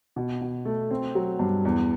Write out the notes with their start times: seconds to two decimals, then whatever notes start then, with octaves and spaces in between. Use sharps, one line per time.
0.16 B2
0.41 B2
0.65 A3
0.91 C4
1.15 F#3
1.39 G2
1.65 E2